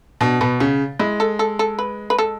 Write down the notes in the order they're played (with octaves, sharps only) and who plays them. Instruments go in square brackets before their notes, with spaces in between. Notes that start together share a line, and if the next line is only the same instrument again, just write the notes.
[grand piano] B2 [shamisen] D4
[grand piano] B2 [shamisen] B3
[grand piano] C#3 [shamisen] C#4
[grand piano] G#3 [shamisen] E4
[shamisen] A4
A4
A4
B4
B4
A4